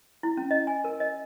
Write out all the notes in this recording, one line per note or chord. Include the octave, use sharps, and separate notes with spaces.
E4
C#4
D#5
G#5
A#4
D#5